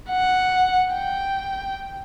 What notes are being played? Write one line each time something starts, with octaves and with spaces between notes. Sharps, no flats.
F#5
G5